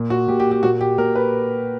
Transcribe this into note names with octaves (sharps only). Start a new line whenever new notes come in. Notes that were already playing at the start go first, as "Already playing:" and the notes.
Already playing: A#2
F#4
A#2 G4
G4
G4
A#2 F#4
G4
A#2 A#4
B4